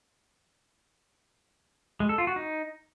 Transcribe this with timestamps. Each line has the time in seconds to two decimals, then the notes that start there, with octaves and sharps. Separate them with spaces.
2.00 G#3
2.09 A4
2.18 F4
2.27 F#4
2.36 D#4